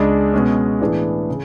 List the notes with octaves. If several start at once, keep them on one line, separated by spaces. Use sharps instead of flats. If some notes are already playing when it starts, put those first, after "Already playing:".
Already playing: C#2 C#3 G#3 D4
B2 G#3 C#4
A2 E3 B3 D4 G#4
C#3